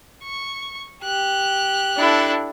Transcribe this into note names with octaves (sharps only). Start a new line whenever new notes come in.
C#6
G4 F#6
D4 E4 A4